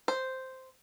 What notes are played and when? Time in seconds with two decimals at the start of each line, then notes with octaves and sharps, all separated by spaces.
0.08 C5